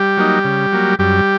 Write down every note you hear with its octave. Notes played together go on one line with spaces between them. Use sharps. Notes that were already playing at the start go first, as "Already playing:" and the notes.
Already playing: G3 G4
F#3 A#3 D#4
C#3
F#3 A#3
F#2 G3 G4